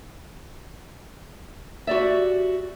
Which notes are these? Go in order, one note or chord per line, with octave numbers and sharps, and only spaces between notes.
F#4 G4 D5 E5